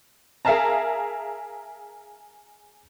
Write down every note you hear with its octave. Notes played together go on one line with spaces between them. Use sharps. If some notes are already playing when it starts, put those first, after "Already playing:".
G#4 A#4 E5 F5 A5 A#5